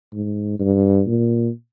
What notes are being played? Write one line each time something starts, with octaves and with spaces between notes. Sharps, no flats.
G#2
G2
A#2